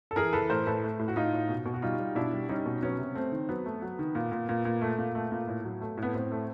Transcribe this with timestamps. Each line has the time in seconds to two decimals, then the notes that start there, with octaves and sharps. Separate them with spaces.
0.11 A4
0.16 E3 G#4 A#4
0.33 E3 A4 B4
0.50 A2 A#4 C5
0.66 A2 A4 B4
0.84 A3
0.99 A2
1.08 F#4
1.16 A2 D#4 F4
1.33 A2
1.49 B2
1.66 B2
1.74 F#4
1.82 G3 D#4 F4
1.99 G3
2.15 B2 D4 E4
2.33 G3
2.49 G3 C#4 D#4
2.66 B2
2.82 F#3 B3 C#4
2.99 C3
3.15 A3 C4
3.32 D#3
3.49 F#3 B3
3.66 A3
3.82 F#3
3.99 D#3
4.15 A#2
4.32 A#2
4.49 A#2
4.65 A#2
4.81 A3
4.98 A#2
5.15 A3
5.32 A#2
5.48 A2
5.64 F#3
5.81 A3
5.97 A2
6.03 B3
6.14 A2 C4
6.32 A3